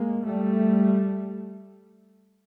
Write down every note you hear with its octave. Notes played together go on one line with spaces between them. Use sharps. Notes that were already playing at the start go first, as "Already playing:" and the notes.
Already playing: G#3 A#3
G3 A3